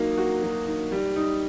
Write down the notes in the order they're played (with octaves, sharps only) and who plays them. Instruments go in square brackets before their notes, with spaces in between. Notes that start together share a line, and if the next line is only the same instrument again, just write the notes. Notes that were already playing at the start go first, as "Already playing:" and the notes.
Already playing: [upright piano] F#3 A#3 D#4
F#4
F#3
D#4
G3
D#4